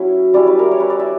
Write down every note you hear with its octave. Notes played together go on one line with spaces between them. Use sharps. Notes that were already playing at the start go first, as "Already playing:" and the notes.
Already playing: F#3 C#4 E4
G3 C#4 E4 D5
B4
A#4
C#5
B4
D5
E5